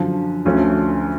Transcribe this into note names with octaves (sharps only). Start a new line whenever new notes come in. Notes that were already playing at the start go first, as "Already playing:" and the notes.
Already playing: F#2 D3 F3
D2 D3 F3 A3 C#4